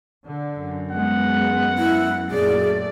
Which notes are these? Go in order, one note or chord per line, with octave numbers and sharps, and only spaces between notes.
D3
F#2
G#3 B3 F#5
E4
F#2 A#2 A3 G#4 D5